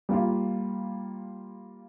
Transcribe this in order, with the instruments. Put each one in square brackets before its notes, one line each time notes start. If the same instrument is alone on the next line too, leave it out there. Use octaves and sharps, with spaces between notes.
[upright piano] G3 A#3 F4